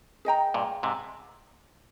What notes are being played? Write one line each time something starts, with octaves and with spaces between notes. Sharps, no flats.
G#4 D#5 G5 A#5
G2 A#2
G#2 C3